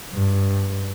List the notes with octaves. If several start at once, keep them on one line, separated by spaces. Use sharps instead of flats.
G2